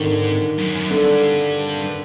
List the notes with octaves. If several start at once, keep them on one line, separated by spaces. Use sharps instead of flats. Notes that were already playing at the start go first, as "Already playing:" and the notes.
Already playing: G#2 D3 D#3
F#2
F#2
G2 D3